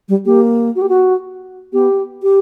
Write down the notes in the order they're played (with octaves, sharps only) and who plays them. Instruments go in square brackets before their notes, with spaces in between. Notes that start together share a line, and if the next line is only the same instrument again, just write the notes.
[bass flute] G3
[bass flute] A#3 [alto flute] G4
[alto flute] F#4
G4
F#4
[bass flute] B3 [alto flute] G4
[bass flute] G4